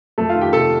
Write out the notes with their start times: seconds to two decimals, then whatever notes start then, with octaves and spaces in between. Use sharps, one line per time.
0.18 F2 A3 A4
0.29 F4 F5
0.35 D#3
0.41 G4 G5
0.53 C3 A4 A5